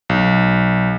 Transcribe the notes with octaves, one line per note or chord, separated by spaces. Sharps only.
B1